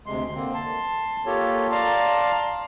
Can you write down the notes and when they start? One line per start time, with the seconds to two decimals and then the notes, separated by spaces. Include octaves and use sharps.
0.06 D2 C3 G#3 C6
0.35 D3 A#3 C4
0.54 A5 C6
1.26 A#3 F4 G4 A4 C#5
1.71 D5 F5 A5 A#5 C6